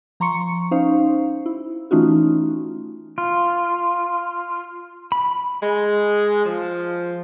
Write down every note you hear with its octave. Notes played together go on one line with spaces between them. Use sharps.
F3 A#5 C6 C#6 C#7
C#4 D#4 C5 F5
E4
E3 A3 C#4 D#4 F4 F#4
F4
B5
G#3
F3